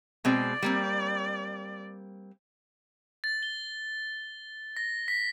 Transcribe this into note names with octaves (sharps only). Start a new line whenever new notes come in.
B2 G#3 C4 D5
G3 A#3 C4
A6
G7
A#6
B6